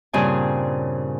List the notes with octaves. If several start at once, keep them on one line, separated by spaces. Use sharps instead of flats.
G2 A#2 C#3 C4 G#4 G#5